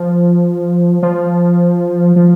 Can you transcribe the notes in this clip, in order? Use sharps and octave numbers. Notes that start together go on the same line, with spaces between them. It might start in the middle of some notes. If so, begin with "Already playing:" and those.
Already playing: F3
F3
F3